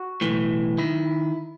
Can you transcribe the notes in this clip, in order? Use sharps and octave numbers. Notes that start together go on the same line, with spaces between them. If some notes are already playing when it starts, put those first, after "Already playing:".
Already playing: F#4
B1 A2 E3
D#3 E4